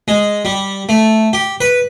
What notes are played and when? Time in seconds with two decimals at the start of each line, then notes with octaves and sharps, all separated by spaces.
0.08 G#3
0.45 G3
0.89 A3
1.33 G4
1.61 B4